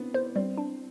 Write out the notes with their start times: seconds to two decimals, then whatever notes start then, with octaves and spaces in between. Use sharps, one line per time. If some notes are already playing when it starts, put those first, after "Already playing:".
Already playing: B3 C4 D4 E4
0.14 B3 C5
0.35 G3 C4
0.58 D4